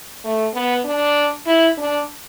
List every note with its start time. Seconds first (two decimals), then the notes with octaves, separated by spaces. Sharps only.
0.24 A3
0.54 B3
0.85 D4
1.46 E4
1.78 D4